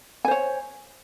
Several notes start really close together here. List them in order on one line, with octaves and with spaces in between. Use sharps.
G#5 C5 C#5